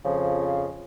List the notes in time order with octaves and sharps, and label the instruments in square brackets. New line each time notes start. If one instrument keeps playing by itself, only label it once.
[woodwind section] F2 C#3 F3